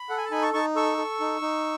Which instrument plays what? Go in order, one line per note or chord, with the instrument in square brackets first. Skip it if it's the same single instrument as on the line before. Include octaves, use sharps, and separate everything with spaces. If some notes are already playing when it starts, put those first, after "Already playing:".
Already playing: [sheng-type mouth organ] B5
A4 F#5
G#5
A5
D#4 G#5 B5
A5 C#6
D#4 A5 C#6
A4 C#6 E6
A4
D#4
D#4